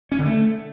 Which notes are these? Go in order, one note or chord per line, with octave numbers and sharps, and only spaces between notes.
C#4
D3
A3